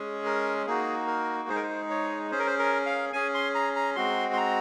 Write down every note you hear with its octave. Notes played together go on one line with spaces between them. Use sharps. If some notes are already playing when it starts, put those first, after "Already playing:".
Already playing: G#3 C#4 G#4
A#4
A#3 D#4 F#4 G#4
A#4
G#3 D#4 G#4 C5
A#4
C5
C#5
C#4 G#4 C5
A#4
C5
A#4
F5
C#4 G#4 G#5
C6
A#5
A#5
G#3 C4 F#4 C6
C6
A#5